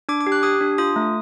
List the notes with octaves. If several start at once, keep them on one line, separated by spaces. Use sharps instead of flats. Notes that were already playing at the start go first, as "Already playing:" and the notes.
D4 D6
D6
G4
F#6
G4 D#6
D4
F4 D#6
A3